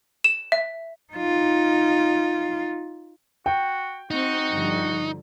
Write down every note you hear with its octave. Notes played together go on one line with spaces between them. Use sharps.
E7
E5
D#4 F4
F#4 G5
C4 D#4 F#4
G2 D3 F3